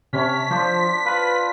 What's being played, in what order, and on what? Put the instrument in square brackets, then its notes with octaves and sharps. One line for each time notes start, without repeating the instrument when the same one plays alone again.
[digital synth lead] C3 [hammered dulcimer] C#4 C#5 A5 [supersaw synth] B6
[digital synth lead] F3 [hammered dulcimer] D4 C5
[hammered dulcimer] F4 [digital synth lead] B4